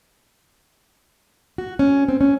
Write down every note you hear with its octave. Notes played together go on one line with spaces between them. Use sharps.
F#4
C#4
C4
C#4